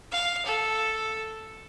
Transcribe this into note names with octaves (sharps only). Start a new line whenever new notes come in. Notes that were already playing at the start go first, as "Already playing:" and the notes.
F5
A4